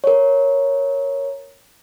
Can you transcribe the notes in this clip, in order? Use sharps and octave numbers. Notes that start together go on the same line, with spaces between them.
A#4 C#5